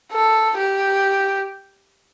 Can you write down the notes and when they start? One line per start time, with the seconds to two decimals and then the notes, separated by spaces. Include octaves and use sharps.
0.12 A4
0.57 G4